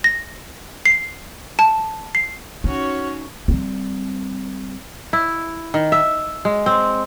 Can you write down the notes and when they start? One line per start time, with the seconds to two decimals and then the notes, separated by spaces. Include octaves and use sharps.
0.04 A#6
0.86 C7
1.59 A5
2.15 C7
2.64 C#4 D#4 F#4 C#5
3.48 G3 C4
5.13 E4
5.74 D#3
5.92 E5
6.45 G#3
6.66 C4